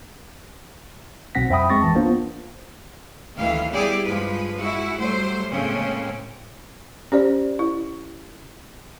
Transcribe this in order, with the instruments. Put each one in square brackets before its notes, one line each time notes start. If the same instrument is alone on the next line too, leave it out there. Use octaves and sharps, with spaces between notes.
[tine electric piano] B1 B2 C4 F#5 A#6 B6
F2 C5 E5 G5 B5 D#6
G#3 C4 C#6 A6 A#6
G#1 E3 A5
A#3 B3 D4 F4 C5
[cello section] D2 A2 D#3 E3 F5
G3 B3 E4 G4 G#4 D5
G2 F3 G#3 B4
G#3 E4 F#4
F#3 G3 A3 C5
A2 C#3 G#3 A#3 C4 C#4
[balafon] C#4 G4 C5 D5
E4